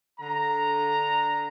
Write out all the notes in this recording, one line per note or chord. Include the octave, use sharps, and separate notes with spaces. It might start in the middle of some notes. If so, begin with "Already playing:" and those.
D3 A#5